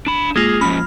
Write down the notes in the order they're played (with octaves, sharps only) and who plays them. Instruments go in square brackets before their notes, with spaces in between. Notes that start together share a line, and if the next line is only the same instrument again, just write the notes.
[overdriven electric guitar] D4 B5 [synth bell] E7
[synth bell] G#3 A#3 F4 [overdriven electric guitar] G#4
[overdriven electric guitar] F3 C#4 [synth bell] B5 F6